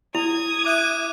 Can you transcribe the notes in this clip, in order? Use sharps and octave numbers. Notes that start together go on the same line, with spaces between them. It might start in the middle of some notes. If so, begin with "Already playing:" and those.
E4 D#6 G#6 F7
E5 D6 F#6 D#7